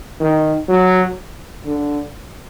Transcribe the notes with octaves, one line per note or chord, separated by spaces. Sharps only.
D#3
F#3
D3